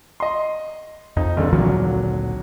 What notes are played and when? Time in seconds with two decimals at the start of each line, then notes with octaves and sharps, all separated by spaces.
0.20 D#5 C6
1.17 F2 D#4
1.37 F1 A#1 D3
1.52 G#1 D2 A#2 D3 F#3